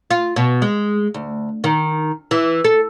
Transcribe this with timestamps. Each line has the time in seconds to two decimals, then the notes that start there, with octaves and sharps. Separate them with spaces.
0.11 F4
0.36 B2
0.62 G#3
1.14 D2
1.64 D#3
2.31 E3
2.64 A4